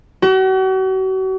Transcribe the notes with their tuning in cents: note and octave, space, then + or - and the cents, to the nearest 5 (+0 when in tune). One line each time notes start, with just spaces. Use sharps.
F#4 +40